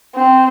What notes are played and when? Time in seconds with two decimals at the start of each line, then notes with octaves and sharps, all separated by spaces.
0.15 C4